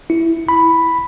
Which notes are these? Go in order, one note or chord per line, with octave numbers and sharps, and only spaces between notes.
E4
B5